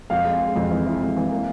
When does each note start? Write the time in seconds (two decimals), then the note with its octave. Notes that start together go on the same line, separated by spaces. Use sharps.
0.10 F2 F5
0.25 G#3
0.41 G#3
0.56 F2
0.71 E3
0.86 E4
1.01 F2
1.17 E3
1.31 A#3